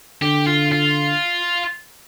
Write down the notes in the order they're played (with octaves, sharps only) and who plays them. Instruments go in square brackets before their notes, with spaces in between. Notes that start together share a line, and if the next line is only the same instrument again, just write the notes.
[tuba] D3 [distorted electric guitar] G4
[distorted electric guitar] F4
F4